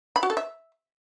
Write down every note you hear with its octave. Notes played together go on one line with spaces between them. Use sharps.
B5
F#4
A4
E5